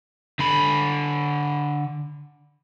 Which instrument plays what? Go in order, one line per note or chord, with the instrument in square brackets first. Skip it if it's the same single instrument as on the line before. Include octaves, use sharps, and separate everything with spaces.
[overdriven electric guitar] D3 B5